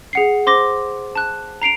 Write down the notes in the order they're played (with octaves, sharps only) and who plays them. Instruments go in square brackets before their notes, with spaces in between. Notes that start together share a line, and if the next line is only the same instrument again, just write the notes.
[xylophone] G#4 F#5 C7
C5 C6 D6 A#6
A5 F#6
A#5 C7 D7 F7